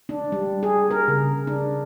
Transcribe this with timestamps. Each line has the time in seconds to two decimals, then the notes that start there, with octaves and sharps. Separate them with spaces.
0.09 D4
0.32 G3
0.63 G#4
0.91 A#4
1.08 C#3
1.47 D4